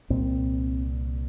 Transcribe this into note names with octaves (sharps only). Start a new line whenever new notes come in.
C2 A#2 C4